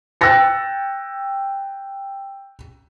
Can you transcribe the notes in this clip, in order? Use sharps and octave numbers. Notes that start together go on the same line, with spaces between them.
G5 E6 F#6 A6 A#6 C#7